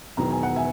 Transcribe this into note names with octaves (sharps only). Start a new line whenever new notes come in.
E1 E2 D#3 F#3 A#5
G#5
F#5
E5 G#5